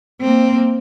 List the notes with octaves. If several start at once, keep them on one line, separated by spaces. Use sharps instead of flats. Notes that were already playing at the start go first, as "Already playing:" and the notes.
A#3 C4